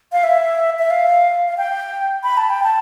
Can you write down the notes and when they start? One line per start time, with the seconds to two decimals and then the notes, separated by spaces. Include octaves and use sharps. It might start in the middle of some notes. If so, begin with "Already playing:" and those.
0.12 F5
0.23 E5
0.79 E5
0.90 F5
1.48 F5
1.57 G5
2.23 B5
2.37 A5
2.50 G5
2.63 A5